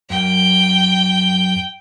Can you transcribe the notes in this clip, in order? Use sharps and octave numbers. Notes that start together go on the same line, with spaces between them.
F#2 G5